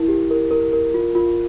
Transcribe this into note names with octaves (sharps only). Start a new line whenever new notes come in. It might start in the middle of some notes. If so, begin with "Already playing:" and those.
Already playing: E4 A#4
G4
A#4
A#4
A#4
F4
F4